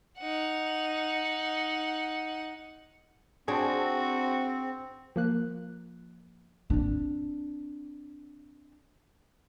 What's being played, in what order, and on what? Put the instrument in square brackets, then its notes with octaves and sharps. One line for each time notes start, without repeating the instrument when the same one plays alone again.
[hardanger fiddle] D#4 F#5
[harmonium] C4 [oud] D4 [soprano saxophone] F#4 [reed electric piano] G#4 C5
[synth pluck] F3 A#3 F#6
[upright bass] C4 D4